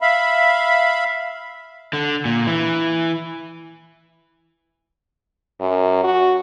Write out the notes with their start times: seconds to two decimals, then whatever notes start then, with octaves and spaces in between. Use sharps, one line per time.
0.01 E5 F5 B5
1.93 D3
2.25 A#2
2.47 E3
5.60 F#2
6.04 F#4